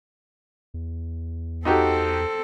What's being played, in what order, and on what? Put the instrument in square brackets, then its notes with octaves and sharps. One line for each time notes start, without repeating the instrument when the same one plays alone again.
[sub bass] E2
[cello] C4 A4 [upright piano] D#4 F#4 G4